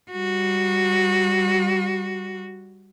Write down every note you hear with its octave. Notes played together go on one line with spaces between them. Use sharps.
G3 F#4